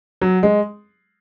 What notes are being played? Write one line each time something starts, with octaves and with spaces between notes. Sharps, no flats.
F#3
G#3